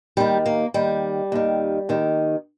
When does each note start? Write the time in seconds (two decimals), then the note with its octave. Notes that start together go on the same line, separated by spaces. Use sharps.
0.17 D#2 D#3 G3
0.46 A#3
0.74 D#2 D#3 G3
1.32 D#2 D#3
1.89 D#2 D#3